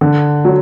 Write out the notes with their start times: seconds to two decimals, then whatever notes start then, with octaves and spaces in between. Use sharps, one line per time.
0.01 D3
0.45 F#3